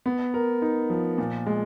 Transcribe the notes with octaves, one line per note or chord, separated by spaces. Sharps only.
B3
A#4
D#4
F3
A#2
G#3